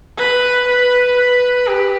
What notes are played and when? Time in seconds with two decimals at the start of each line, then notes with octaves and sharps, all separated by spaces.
0.18 B4
0.68 B4
1.17 B4
1.67 G4